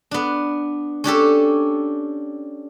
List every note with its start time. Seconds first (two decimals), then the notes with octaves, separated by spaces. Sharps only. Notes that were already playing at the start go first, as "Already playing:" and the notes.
0.11 B3 D4
1.04 C#4 D4 G4 A4